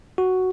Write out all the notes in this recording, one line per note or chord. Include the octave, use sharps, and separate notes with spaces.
F#4